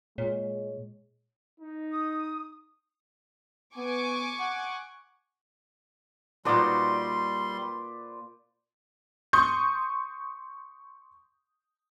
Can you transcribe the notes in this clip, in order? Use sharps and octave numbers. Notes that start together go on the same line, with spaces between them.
A#2 G#3 C#5
D#4
D#6
B3 G#5 C#6 D6
F#5
A#2 G3 D#4 F#4 B4 C5 D5 C6
C6 C#6 D#6 G6